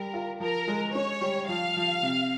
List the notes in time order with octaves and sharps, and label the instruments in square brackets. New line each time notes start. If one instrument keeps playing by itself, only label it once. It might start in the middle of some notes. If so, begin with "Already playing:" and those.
Already playing: [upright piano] G3 [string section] A#4
[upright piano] F4
[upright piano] F3 [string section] A#4
[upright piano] G#3
[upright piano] C#4 [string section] C#5
[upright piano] G3
[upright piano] F3 [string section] F5
[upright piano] F3
C3